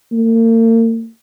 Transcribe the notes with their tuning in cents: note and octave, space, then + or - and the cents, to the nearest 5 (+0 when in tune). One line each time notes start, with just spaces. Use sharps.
A#3 -40